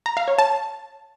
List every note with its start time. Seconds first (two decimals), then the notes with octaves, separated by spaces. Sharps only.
0.06 A#5
0.17 F5
0.28 C#5
0.39 A5